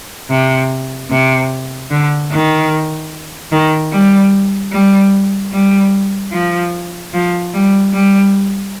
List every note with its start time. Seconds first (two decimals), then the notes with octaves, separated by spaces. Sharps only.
0.30 C3
1.10 C3
1.91 D3
2.31 D#3
3.52 D#3
3.92 G3
4.72 G3
5.52 G3
6.32 F3
7.14 F3
7.54 G3
7.93 G3